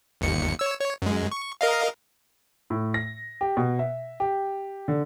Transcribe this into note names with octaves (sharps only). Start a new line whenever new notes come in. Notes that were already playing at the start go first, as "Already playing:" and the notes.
G1 D#2 C#7
C#5 E6
C#5
F#2 G#3
C#6
A#4 D#5 F5
A2
A#6
G4
B2
E5
G4
D3